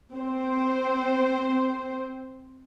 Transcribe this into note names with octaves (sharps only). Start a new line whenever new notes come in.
C4 C5